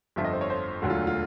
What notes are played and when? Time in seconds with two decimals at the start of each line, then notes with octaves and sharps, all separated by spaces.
0.16 G1 F2 D3 F3 E5
0.25 D#5
0.33 C5
0.41 C#5
0.50 C5
0.82 E1 D2 D3 F#3 F#4
0.90 F4
1.07 F4